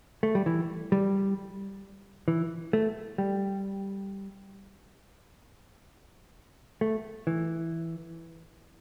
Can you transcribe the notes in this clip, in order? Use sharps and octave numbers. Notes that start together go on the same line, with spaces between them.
A3
G3
E3
G3
E3
A3
G3
A3
E3